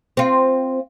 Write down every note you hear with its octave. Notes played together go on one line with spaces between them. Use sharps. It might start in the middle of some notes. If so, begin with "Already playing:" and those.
C4 F4